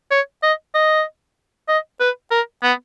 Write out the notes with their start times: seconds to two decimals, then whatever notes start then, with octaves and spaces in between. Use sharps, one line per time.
0.11 C#5
0.43 D#5
0.74 D#5
1.68 D#5
2.00 B4
2.31 A#4
2.63 B3